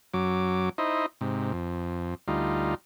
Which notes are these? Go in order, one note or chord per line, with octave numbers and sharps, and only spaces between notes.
F#2 F#3 D6
D#4 E4 C5 D#5
G#2 C3
F2
D2 G3 D#4 F4